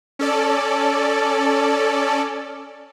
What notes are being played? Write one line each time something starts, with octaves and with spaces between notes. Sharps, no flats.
C#4 A4 D5